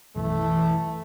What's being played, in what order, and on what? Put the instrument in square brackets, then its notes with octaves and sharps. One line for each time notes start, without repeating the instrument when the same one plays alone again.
[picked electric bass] B1 F#2 [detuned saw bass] E3 [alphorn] A3